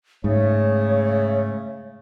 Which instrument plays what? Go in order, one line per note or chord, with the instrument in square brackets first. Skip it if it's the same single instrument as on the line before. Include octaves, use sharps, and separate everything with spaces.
[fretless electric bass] G#2 [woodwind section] C#3 A3 [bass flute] C#5